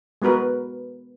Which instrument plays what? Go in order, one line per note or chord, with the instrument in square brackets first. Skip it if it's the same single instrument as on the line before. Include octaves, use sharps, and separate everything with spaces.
[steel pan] G#3 B3 F#4 A#4 B4